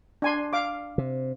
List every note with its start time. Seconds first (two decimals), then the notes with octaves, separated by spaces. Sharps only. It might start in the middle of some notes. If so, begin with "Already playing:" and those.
0.22 D4 G#5 C6
0.53 F5 D6
0.98 C3